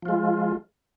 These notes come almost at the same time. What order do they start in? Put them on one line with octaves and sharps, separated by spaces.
F3 F4 G#3